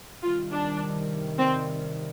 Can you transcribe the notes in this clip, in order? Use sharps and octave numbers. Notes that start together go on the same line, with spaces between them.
C3 D#3 G3 F4
D4
C4